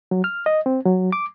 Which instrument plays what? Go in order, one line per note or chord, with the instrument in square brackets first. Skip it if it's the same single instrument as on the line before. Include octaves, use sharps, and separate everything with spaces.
[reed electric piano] F#3
F6
D#5
C4
F#3
D6